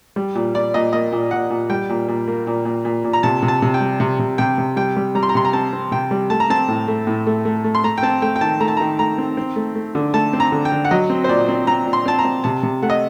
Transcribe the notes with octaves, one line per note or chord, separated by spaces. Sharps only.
G3
A#2
A#2 D5
A#2 D#5
A#3 D#5
A#2
A#2 F#5
A#2
G3 G5
A#2
A#2
A#3
A#2
A#2
A#2
A#2
A#5
C3 A5
C3
A5
C3
G5
G3
C3
C3
C3 G5
C3
G3 G5
G3
G3 A#5
C6
A#5
C3 C6
A#5
C4 A5
C4
C3 G5
G3
A3 A5
A#5
C4 A5
A2
A3
A2
A3
A3
A3
C6
A3 A#5
G5
C4 A5
A3 G5
G5
D#3 A5
A3 A#5
A5
D#3 A#5
A3 A#5
C4
C4
A3
A3
D3
A3 A5
C4
A#5
D3
G5
D3
F#5
F#3 D#5
C4
C5
A#2 D5
C4
C4 A#5
A#2
C6
C4 A5
A#5
C4
C3 A5
C3
A3 F#5
D#5